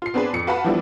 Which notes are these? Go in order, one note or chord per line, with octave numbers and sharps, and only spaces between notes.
F4 C7
B3 C4 D4 G#4 B4
F2 C#7
F#4 B4 F5 F#5 A5 B5
E3 F3 G3 B3 D4 E4